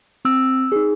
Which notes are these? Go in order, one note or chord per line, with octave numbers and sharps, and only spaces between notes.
C4 E6
D#4 G#4